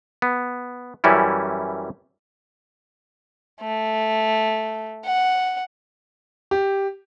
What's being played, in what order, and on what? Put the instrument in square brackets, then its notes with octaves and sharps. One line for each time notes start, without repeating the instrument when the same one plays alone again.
[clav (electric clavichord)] B3
F#2 E3 G3 C#4 E4
[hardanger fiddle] A3
F#5
[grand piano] G4